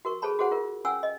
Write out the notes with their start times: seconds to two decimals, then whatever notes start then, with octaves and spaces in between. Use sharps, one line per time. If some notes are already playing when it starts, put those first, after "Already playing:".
0.05 F#4 A#4 C#6
0.22 G#4 A4 C5 C#5 A5 B5
0.39 F#4 G#4 A4 C5 C#5 F#5
0.51 F4 A#4
0.85 C#4 C#5 F#5 G#5 E6
1.03 D#5